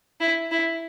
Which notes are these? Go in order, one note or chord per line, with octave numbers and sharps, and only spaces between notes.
E4
E4